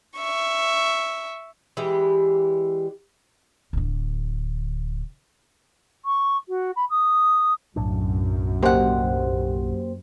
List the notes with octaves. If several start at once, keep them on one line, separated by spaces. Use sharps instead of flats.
E5 C#6
E3 G3 G#3 G4
D1 D3
C#6
F#4
B5
D#6
B1 F#2 A2 D4
B2 A#3 G4 C5 F#5